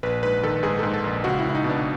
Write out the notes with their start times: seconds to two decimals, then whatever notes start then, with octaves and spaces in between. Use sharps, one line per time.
0.03 A#1 B4
0.23 G#2 B4
0.43 D#3 A4
0.63 G#2 G#4
0.79 G#2 A4
0.94 A4
1.04 A#1
1.24 C#2 F#4
1.39 E4
1.44 C#2
1.49 E4
1.55 D#4
1.64 B2
1.70 D4